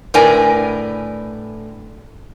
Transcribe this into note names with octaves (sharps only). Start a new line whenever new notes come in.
A2 D3 A#4 B4 D5 G#5